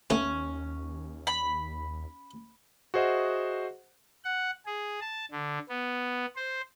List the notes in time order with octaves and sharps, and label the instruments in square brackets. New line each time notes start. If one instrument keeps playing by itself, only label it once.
[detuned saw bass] D#2 [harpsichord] A3 B3 [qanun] C#4
[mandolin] B5
[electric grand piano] F#4 G#4 C5 D#5 E5 F#5
[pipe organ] F#5
G#4
A5
D3
B3
C5